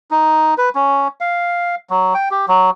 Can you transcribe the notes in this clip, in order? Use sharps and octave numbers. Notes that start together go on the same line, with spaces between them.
D#4
B4
C#4
F5
F#3
G5
G4
F#3